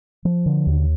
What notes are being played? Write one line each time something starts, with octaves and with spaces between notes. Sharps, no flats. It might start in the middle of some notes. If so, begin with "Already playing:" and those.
F3
D3
D#2